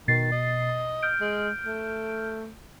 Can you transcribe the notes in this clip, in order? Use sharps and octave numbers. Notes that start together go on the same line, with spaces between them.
B2 D#3 A6 C7
D#5
F6 G6 D7
G#3
A3